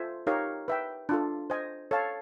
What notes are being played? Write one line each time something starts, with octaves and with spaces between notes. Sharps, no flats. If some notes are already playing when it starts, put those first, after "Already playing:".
Already playing: F4 A4 C5 E5 G#5
D#4 G4 A#4 C#5 F5
B4 E5 G5
D4 F4 A4
C5 D#5 G#5
A4 C#5 F5 A5